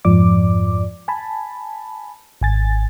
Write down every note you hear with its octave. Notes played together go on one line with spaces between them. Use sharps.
F2 G#2 F3 D5 D6
G#5 A5 B5
G#1 G#5 A6